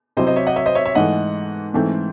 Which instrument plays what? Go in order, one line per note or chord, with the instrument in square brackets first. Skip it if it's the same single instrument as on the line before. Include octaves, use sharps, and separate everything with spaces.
[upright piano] C3 F#3 C4 E4 [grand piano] C5 D#5
[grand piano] C5 D#5
C#5 E5
D#5 F#5
C#5 E5
C5 D#5
C#5 E5
C#5 E5
[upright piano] G#2 E3 A3 [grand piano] D#5 F#5
[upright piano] G#2 E3 A3 C4